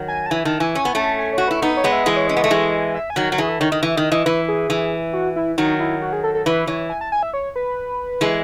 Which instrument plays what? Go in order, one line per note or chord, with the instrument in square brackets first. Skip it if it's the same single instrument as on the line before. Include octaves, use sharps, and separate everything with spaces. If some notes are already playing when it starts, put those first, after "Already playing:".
Already playing: [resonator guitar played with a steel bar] D#3 F#3
[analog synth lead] G#5
A5
[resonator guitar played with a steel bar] E3 [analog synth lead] G#5
[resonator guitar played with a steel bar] D#3 [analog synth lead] A5
[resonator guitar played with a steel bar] E3 [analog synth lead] G#5
[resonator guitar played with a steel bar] C#4 [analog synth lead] G#5
[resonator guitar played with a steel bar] B3
[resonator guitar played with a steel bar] A3 C#4 [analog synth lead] A5
[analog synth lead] G#5
[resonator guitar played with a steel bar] F#4 [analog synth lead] C#5
[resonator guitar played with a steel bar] E4 [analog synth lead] B4
[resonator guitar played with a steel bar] B3 D#4 [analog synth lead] B4
[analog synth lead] C#5
[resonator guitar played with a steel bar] G#3 B3
[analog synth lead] E5
[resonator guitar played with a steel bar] E3 G#3 [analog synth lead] D#5
[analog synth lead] C#5
[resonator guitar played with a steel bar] C#4 [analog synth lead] D#5
[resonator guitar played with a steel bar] B3
A3
E3 G#3
[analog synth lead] E5
G#5
[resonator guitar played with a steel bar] D#3 F#3 [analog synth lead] F#5
[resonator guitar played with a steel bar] F#3
[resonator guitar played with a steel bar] E3 [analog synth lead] G#4
[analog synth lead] A4
[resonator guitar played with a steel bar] D#3 [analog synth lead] C#5
[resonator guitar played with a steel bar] D#3 [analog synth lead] D#5
[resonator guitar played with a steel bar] E3 [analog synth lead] E5
[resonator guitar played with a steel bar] D#3 [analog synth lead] D#5
[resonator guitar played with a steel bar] E3 [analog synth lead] D#5
[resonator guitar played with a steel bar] E3 [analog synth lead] B4
[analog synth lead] G#4
[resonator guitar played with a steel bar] E3
[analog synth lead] F#4
E4
[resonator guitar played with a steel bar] D#3 F#3 [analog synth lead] D#4
[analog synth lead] E4
F#4
G#4
A4
A4
[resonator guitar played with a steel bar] E3 [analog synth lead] B4
[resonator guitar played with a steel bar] E3 [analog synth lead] C#5
[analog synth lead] G#5
A5
G#5
E5
C#5
B4
[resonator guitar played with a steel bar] E3 G#3